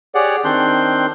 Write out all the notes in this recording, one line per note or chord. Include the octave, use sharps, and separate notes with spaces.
G4 G#4 C#5 D5 F#5
D#3 C4 D4 C6 F#6 G6